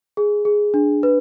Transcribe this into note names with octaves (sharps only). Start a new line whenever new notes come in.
G#4
G#4
D4
B4